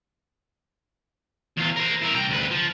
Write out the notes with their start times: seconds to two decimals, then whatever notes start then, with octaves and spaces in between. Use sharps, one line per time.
1.57 E2 F4
1.77 A#4 C5
2.02 E4 A#4
2.15 C2 G5
2.29 D2 B4
2.51 F3